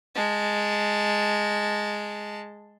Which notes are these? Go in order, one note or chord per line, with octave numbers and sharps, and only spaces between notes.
G#3 A5